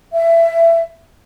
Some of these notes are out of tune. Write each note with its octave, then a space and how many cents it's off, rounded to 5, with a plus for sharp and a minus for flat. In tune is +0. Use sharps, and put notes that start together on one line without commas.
E5 +20